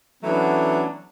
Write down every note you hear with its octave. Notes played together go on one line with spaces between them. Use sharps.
E3 F#3 A3 B3 C#4 D4